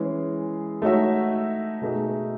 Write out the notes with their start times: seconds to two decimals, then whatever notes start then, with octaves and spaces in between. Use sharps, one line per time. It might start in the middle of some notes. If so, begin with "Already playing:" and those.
Already playing: E3 G#3 C#4 G#4
0.82 A3 D#4 F#4 C#5 E5
1.81 B2 A3 D#4 G#4